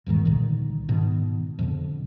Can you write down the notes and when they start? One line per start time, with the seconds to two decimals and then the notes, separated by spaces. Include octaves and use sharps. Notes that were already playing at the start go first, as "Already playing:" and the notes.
0.06 D#1 E2 G#2 D#3
0.25 C2 A#2 D3 D#3
0.88 G#2 B2 D#3
1.59 F2 B2 D3